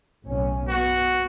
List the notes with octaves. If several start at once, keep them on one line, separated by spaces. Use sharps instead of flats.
B1 A2 C#4
B3 F#4